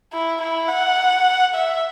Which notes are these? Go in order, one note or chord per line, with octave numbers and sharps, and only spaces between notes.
E4
E4
F#5
E5